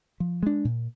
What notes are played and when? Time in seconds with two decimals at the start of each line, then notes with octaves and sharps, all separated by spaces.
0.20 F3
0.43 G#3 D4
0.65 A#2